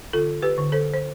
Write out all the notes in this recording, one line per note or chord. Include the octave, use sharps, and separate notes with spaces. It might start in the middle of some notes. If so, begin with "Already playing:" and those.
D3 F4 A4
G4 B4
D3
A4 C5
C5